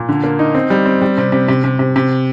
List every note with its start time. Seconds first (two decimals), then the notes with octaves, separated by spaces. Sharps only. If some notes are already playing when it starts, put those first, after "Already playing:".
Already playing: A#2
0.09 D3
0.24 A#3
0.39 D#4
0.55 C4
0.70 G3
0.86 C4
1.02 G3
1.18 C3
1.32 C3
1.48 C3
1.64 C3
1.79 C3
1.96 C3